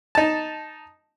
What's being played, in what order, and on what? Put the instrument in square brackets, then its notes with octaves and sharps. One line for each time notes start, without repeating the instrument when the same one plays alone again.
[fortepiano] D#4 A5